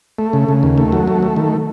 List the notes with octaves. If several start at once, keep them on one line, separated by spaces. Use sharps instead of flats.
A3
C#3
C#3
D#2
A3
F#3
A3
A3
D#3